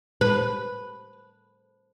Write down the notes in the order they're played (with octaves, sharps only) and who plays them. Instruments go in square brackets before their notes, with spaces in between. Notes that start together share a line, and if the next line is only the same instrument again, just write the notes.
[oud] B4